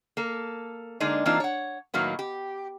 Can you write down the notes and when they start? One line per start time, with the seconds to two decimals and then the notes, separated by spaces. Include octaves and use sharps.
0.17 A#3 A4
1.00 D3 G#3 A#3 D4 D#4
1.26 E3 A#3 C4 D4 D#4 F4
1.40 C#5 F#5
1.94 A2 D#3 F#3 A#3 B3
2.19 G4